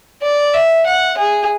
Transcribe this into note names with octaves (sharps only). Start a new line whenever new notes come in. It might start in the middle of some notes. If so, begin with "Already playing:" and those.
D5
E5
F#5
G#4